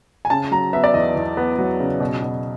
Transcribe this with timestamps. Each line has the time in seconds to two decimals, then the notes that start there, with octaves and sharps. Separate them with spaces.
0.25 G#5
0.30 C#3 A5
0.51 F#3 A#5
0.73 B3 E5
0.84 D5
0.94 E2 D#5
1.16 E2
1.37 B3
1.59 F#3
1.80 C#3
2.00 B2
2.22 B2